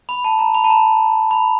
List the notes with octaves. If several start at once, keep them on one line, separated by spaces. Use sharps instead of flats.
B5
A5
A#5
B5
A5
A#5
B5